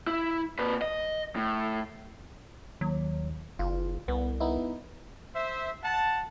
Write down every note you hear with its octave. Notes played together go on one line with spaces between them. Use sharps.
E4
A#2 B4
D#5
A2
D#2 F#3
F#1 F4
C2 B3
B3 D#4 E4
C5 E5
F#5 A5